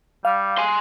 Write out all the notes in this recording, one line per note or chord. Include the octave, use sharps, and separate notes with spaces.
G3 F5
G#5 C6